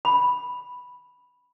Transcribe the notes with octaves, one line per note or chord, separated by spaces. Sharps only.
B5